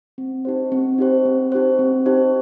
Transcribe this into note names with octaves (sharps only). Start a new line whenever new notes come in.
C4
D#4 G4 C5
C4
D#4 G4 C5
C4
D#4 G4 C5
C4
D#4 G4 C5